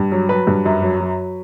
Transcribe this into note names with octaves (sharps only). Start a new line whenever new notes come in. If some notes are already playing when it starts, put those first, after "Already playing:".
Already playing: G2
F#3
F#3 B4
G2
F#2
F#3
F#3